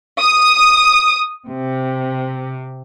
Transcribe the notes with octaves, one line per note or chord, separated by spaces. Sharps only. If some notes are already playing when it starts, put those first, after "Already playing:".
D#6
C3